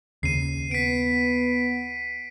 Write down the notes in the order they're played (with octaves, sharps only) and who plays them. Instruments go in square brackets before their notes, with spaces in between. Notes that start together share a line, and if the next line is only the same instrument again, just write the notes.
[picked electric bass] D#2 C#3 [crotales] C7 D#7
[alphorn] B3 [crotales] B6 D7